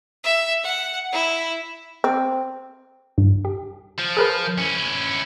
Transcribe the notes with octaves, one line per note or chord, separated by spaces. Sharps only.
E5
F#5
E4
C4
G2
G4
F3
G#4 A#4 B4
C#4 E4